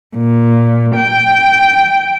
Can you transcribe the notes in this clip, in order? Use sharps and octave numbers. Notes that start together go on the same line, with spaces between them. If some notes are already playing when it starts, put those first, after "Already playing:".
A#2
G5